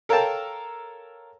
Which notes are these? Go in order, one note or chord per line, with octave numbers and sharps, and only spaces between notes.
A4 A#4 C#5 F5 G5 A5